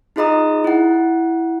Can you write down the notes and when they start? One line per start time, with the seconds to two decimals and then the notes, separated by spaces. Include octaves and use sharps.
0.16 D#4 F4 G#4 D#5 A#5 D#6
0.64 E4 F#5